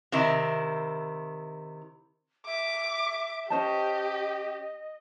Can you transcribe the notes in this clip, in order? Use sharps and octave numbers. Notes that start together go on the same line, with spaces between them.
C3 D#3 E4
E5 D6
C#4 G4 C5 D#5 A5